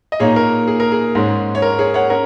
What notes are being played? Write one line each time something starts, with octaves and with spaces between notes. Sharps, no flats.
D#5
A#2 A#3 D#4 G#4 C#5
A#4
G#4
A#4
G#4
G#2 G#3 C#4
C#5
A#4
G#4 C#5
C#5 F#5
C#4 A#4